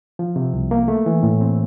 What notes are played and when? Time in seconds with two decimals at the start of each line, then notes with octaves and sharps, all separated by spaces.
0.19 F3
0.36 C3
0.54 C2
0.71 A#3
0.88 A3
1.06 E3
1.23 A2
1.41 C4